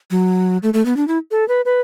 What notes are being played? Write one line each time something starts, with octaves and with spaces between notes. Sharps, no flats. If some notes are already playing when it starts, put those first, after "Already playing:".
F#3
A3
A3
B3
D4
E4
A4
B4
B4